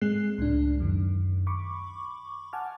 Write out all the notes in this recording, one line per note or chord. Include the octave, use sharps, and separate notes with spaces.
G#2 G#3 C4 G#4 F#6 C7
C#2 A2 D4
F#2 D#3
B5 C#6 D6
F#5 G#5 A5 D6 F6